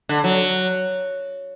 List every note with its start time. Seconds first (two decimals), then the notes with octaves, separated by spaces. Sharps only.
0.09 D3
0.24 F#3